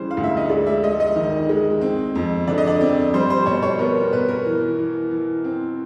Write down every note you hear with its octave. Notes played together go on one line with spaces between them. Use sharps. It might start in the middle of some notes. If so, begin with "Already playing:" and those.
Already playing: C#3 E3 G3 C5
F5
D2
E5
D#5
G#3 D5
E5
G#3 D#5
D#5
D#3
G#3
C4
F2
D3 D5
D#5
D5
C4
G3 C5
C5
B2 C#5
C#5
B3 A#4
B2 B4
A#4
E3
E3
E3
C4